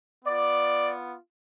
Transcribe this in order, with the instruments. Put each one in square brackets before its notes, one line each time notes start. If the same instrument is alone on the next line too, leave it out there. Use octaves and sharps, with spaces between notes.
[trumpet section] B3 F4 D5